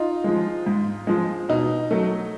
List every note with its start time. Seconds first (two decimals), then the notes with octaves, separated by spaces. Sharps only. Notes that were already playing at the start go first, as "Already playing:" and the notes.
Already playing: D#4 F4
0.24 F3 G#3
0.66 G#2
1.07 F3 G#3
1.49 B2 D#4
1.91 F#3 A3